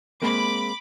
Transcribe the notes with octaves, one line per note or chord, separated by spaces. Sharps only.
G#3 A#3 C4 B5 D6